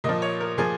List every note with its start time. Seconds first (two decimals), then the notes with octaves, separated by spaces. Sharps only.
0.04 A#2 F3 D#5
0.22 C#5
0.41 A#4
0.58 A#2 F3 G#4